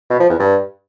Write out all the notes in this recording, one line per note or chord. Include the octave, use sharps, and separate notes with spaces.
B2
F3
E2
G2